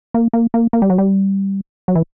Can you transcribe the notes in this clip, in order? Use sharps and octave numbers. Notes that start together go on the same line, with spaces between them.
A#3
A#3
A#3
A#3
G3
F#3
G3
F#3
E3